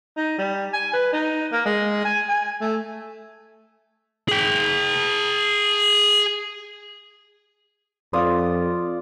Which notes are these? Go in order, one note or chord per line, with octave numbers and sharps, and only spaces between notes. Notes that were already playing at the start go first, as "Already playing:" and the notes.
D#4
G3
G#5
B4
D#4
A#3
G#3
G#5
G#5
A3
G#4 G5
F2 F4 D5 D#6